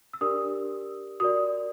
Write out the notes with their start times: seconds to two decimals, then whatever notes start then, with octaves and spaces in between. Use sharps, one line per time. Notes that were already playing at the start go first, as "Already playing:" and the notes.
0.13 E6
0.21 D4 G4 A#4 D5 D#6
1.20 F#4 A#4 D5 D#6